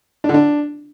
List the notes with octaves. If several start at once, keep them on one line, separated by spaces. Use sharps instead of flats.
D4
D3
D4